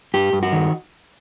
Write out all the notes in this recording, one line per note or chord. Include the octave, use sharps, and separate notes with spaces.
G2 G4
G2
F#4
D#3